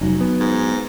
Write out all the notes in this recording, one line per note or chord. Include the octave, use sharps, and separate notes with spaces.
F1 F#3 C#4 D#4
B3
G#2